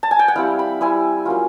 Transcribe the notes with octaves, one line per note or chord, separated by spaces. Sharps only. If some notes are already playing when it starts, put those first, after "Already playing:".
A5
G#5
G5
F#5
G3 C4 E4 F5
B5
G3 C4 E4 G#5
F#3 A#3 C#4 F4